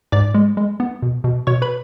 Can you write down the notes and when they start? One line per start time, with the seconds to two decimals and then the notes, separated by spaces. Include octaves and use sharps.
0.12 G#2 D5 D6
0.35 G#3
0.57 G#3
0.80 B3
1.02 B2
1.24 B2
1.47 B2 C#5 C#6
1.62 B4 B5